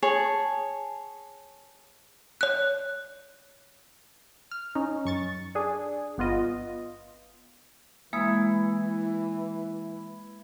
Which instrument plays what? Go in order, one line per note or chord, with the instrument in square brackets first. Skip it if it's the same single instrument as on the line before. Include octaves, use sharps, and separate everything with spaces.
[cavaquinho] G#4 C#5 A5
[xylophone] C#5 F#6
[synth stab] F6
C#4 D#4
F#2 C#6 A6
D4 G#4
G1 B3 F4 D#5
[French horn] E3 [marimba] G#3 A#3 D#6 [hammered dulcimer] E4